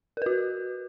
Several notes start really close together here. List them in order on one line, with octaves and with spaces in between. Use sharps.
A#4 B4 F#4